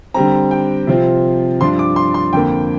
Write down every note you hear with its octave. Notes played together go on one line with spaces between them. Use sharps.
D3 G3 C4 A#5
G5
C3 F3 C4 F4
G2 F3 D4 C6
D6
C6
C6
F2 D3 A#3 G5